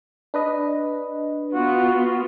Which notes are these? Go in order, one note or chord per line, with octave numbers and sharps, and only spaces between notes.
D4 B4 D#5
B3 F4 F#4